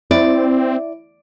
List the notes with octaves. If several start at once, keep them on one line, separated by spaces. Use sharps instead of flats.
C4 E4 D5